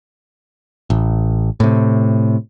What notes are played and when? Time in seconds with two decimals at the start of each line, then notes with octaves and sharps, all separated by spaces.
0.90 A1
1.60 A2 C3